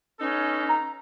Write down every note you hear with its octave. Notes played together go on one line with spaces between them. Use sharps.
B3 C#4 D#4 A4
A#5